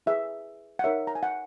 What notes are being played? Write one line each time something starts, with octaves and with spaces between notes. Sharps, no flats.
E4 G#4 B4 E5
F#5
D#4 A#4 C#5 E5
A#5
G#5
F#5